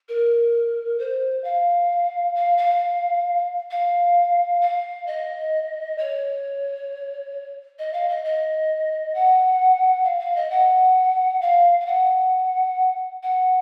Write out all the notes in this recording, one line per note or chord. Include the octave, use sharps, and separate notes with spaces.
A#4
C5
F5
F5
F5
F5
F5
D#5
C#5
D#5
F5
D#5
D#5
F#5
F5
F5
D#5
F#5
F5
F5
F#5
F#5